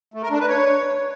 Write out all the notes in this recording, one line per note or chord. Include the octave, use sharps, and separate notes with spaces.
A3
A#4
D4
B4
C#5